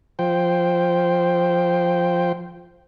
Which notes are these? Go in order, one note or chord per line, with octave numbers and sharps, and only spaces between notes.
F3 C5 G5